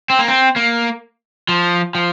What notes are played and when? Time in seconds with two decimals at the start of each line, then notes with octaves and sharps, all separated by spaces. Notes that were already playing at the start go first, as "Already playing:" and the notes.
0.10 C4
0.19 A#3
0.28 C4
0.56 A#3
1.49 F3
1.95 F3